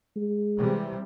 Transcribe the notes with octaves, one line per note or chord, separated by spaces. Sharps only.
G#3
C3 E3 G3